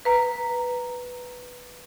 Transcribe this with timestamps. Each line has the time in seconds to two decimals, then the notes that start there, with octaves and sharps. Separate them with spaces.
0.05 B4 A#5